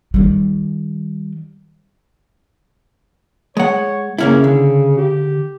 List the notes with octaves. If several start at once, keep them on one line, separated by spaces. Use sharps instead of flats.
D#3 G3
G#3 C#5 F#5
C#3 A#3 C#4 E4
D3
G4